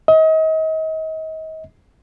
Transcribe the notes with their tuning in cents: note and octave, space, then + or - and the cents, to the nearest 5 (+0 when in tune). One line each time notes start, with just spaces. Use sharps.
D#5 +35